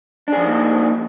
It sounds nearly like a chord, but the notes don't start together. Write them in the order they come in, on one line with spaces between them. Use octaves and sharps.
D4 G#4 F3 D#4 A#3